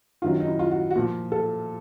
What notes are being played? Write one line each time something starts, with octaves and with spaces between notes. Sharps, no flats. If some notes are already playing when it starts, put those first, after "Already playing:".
F#2 D#3 F#3 F4
D#4
E4
F4
F#4
F#4
A#2 F3 F4
A4